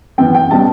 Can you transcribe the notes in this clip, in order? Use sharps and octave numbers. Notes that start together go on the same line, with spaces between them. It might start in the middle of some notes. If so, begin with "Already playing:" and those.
F#2 E3 B3 G5
G5
B2 G3 C#4 A5